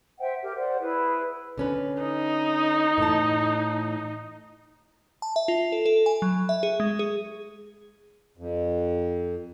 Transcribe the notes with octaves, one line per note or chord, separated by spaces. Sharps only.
C5 E5 F#5 G5
G4 A#4
C5 D5 F#5
E4 G#4 B4
D3 C#4 B4
D#4
A2 E3 A5
A5
E5
F4
A4
A4
G#5
F#3
E5
G#4
G#3
G#4
F2